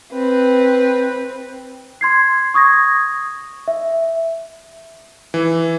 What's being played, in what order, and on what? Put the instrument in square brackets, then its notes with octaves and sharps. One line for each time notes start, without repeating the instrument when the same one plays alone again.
[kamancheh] C4 B4
[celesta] C6 G#6 C7
C#6 D#6 G#6 A#6
E5
[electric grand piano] E3